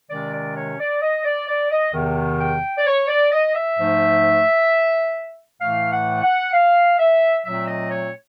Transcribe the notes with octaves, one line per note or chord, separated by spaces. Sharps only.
C3 D#3 G#3 C#4 D5
D5
C#5
D5
D#5
D5
D5
D#5
E2 C3 D#3
G5
D5
C#5
D5
D#5
E5
G#2 F3 A3
A2 E3 A3 F5
F#5
F#5
F5
E5
A#2 F#3 A3 C4 E5
D#5
C#5